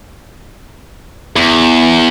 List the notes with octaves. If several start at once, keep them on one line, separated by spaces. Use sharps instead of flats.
E2